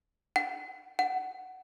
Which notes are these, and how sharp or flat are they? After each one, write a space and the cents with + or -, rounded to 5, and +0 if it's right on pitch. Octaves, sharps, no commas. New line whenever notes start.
F#5 +30
F#5 +15